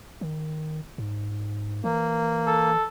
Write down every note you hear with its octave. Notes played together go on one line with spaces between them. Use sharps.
D#3
G#2
E3 A#3
A4